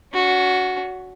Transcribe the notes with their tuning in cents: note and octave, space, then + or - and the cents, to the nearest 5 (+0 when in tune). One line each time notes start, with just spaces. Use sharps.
C#4 +40 F#4 +0